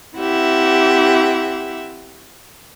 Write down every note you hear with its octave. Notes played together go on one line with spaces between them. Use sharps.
C4 E4 G4 E5 F#5